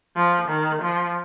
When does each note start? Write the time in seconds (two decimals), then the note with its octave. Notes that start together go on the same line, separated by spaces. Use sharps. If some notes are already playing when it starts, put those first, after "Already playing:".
0.16 F3
0.49 D#3
0.82 F3